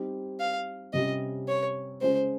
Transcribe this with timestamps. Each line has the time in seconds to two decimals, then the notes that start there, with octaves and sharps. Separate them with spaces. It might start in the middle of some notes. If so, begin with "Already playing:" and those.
Already playing: G3 C4 D#4 G4
0.40 F5
0.93 C3 G3 C#4 G4 D#5
1.48 C#5
2.01 C#3 G#3 C#4 G#4 C5